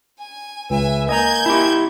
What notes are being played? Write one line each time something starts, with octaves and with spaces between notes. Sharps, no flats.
G#5
C#2 B4 E5 G#5
A#3 D#5 G#5 A#5 G6 G#6
E4 G4